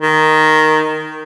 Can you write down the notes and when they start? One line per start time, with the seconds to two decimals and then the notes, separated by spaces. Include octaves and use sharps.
0.02 D#3